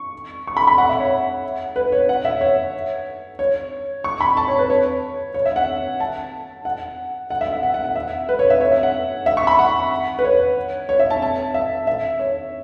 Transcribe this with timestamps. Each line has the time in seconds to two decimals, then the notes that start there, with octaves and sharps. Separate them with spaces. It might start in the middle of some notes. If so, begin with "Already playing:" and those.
Already playing: C#6
0.47 C#6
0.57 B5
0.67 B5
0.78 F#5
0.89 E5
1.00 C#5
1.76 B4
1.92 C#5
2.09 F#5
2.25 E5
2.41 C#5
3.39 C#5
4.04 C#6
4.21 B5
4.37 A5
4.48 C#5
4.59 B4
4.70 C#5
5.34 C#5
5.46 E5
5.56 F#5
6.00 A5
6.65 F#5
7.30 F#5
7.41 E5
7.52 E5
7.63 F#5
7.74 F#5
7.84 F#5
7.96 E5
8.29 B4
8.39 C#5
8.50 E5
8.61 C#5
8.72 E5
8.83 F#5
9.26 E5
9.37 C#6
9.47 B5
9.59 F#5
10.19 B4
10.24 C#5
10.89 C#5
11.00 E5
11.10 A5
11.22 A5
11.54 E5
11.87 E5
12.20 C#5